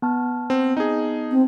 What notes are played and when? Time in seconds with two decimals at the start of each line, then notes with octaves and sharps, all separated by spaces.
0.02 B3 A5 F6
0.50 C4
0.77 D#4 G#4
1.32 C4